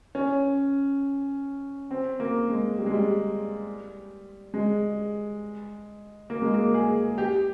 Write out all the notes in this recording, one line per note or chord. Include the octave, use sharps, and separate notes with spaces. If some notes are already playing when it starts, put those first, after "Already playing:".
C#4
C4
A#3
G#3
G3
G#3
G3
G#3
A#3
G#3
A#3
G#4
G4